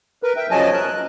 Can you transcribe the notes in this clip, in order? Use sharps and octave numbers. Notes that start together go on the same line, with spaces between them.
A#4 B4
E5 G5
C#3 F3 F#3 D#5 G#5 A5
F#2 A#4 F#6
F#6